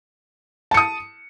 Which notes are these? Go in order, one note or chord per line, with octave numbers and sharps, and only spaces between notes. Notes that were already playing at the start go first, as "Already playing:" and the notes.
A5 D#6 C#7